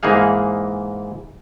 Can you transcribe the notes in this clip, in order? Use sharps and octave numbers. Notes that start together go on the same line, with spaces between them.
G#2 E3 A#3 D#4 G#4 F5